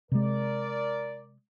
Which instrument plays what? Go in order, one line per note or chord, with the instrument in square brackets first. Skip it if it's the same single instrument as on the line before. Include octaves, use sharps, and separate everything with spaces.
[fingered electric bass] C3 G#3 [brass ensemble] A#4 D5